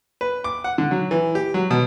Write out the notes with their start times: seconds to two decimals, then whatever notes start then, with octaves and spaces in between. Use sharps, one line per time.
0.21 B4
0.44 D6
0.64 F#5
0.78 D3
0.91 F#3
1.11 E3
1.35 G4
1.54 F#3
1.71 B2